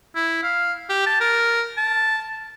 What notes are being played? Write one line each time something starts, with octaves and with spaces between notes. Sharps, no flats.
E4
F5
G4
A5
A#4
A5